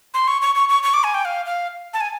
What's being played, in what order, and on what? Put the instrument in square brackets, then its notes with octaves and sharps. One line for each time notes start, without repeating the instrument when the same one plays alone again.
[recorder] C6
C#6
C#6
C#6
C#6
C#6
D6
G#5
G5
F5
F5
A5
G#5